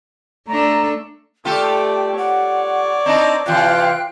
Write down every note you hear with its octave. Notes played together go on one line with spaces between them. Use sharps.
A3 D4 A4 A#5
A3 F4 G4 A4 D5 G5
C#5 D5 F#5
C4 D4 D#4 D#5 A5 A#5
C3 E3 F4 F5 G5 F#6